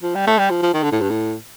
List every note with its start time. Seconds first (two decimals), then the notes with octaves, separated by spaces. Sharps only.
0.03 F3
0.15 G3
0.27 A3
0.39 G3
0.51 F3
0.63 F3
0.74 D#3
0.83 D3
0.92 A2
1.01 G2
1.10 A2